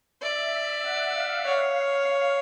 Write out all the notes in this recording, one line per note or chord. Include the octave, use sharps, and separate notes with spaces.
D5 E5
F#5
F5
C#5 F5
F5
F5